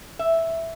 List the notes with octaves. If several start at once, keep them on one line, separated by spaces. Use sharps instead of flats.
E5